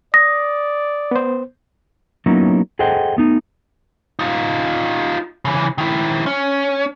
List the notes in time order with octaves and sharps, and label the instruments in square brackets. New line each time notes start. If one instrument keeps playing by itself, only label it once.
[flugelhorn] D5 [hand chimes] D#6 [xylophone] A#6
[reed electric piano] B3 C5
[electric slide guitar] F#3 A#3 B3 C#4 D#4 E4
G#4 A4 C5 D#5 F#5 G5
A3 B3 D#4
[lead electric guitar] D#4 F4
C#3 E3
D#3 E4
C#4